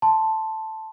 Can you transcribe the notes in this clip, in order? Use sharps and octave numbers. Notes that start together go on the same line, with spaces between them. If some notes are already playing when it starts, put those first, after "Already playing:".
A5 C6